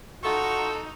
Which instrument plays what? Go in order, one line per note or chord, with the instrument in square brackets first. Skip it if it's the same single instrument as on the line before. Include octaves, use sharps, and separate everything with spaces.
[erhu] D#4 [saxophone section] F4 A4 [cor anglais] F#4 [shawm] C#6